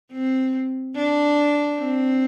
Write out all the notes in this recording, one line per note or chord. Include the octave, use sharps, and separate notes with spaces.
C4
D4
C4